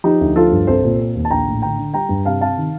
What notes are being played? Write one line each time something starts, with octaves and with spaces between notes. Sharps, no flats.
F3 D#4 G4
D2
F3 F4 A4
G2
C2 A4 C5
A#2
C4
D#2
A5
A#1 G5 A#5
A2
D3 G5 A#5
D3
G3 G5 A#5
G2
C3 F5 A5
C3 F5 A5
D#3